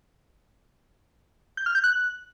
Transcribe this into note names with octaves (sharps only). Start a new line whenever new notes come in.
G6
F6
G6
F#6